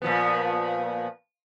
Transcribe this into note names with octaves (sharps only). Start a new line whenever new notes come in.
A#2 F3 B3